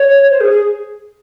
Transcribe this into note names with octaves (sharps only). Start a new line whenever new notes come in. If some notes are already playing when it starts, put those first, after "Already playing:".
Already playing: C#5
C5
G#4
G#4